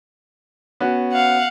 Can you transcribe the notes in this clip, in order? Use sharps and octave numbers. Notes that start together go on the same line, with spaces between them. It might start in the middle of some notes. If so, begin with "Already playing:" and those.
B3 C#4 F#4
F5 F#5